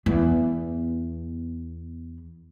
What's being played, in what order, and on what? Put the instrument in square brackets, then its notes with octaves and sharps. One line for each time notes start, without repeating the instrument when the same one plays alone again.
[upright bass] E2 B3